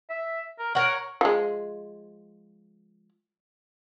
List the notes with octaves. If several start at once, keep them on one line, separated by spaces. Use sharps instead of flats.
E5
A#4
A#4 C#5 F#5
F3 G#3